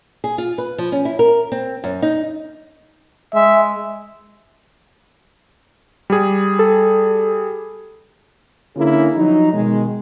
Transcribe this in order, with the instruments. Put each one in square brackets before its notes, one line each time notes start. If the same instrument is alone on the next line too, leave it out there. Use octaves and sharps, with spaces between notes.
[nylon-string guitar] G#4
F4
B4
F3
C#4
E4
A#4
C4
F#2
D#4
[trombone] G#3 [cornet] E5
[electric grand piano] G3 G#4
[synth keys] A4
[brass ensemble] D3 A#3 C#4 E4 G#4
F3 F#3 D#4
B2 D#3 G#3